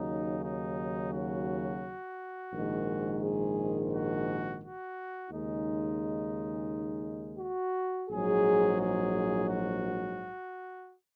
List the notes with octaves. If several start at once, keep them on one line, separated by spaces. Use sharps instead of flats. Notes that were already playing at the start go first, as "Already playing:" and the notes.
Already playing: D#2 C#3 F#3 D#4
D#4
F#4
A#1 G#2 D#3 G#3
G#4
F#4
F#4
D#2 C#3 G#3 D#4
F#4
A#1 G#2 F#3 G#4
G#4
F#4